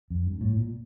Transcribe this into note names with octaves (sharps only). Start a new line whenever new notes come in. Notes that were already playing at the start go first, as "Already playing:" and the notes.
F2
G2
A2
A#2